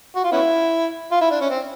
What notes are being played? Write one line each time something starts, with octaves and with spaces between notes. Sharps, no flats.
F#4
F4
B3 C#4 E4
F4
E4
D4
C#4
C4